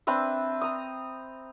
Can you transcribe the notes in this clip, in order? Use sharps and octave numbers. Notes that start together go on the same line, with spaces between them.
C4 D4 B4 E5
A#5 D#6